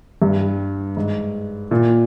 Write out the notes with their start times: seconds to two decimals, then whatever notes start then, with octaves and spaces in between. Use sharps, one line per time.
0.22 G2
0.97 G#2
1.71 A#2